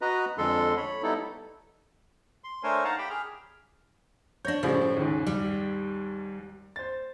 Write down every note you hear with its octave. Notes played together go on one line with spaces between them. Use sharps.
F#4 B4 D#5 A#5
F2 D3 G#3 A4 C6
C#5 B5
G3 B3 D#4 E4 A4
C6
A3 D4 A#4 C5 C#5 G#5
D#4 F5 F#5 A5 A#5
G4 G5 B5
G#4 F6
D4 C#5 G6 A#6
A2 C#3 F3 G3
D#2 G#2
G3
C5 A6